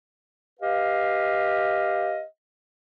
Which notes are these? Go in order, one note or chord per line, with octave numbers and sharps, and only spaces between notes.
G4 B4 D#5 F5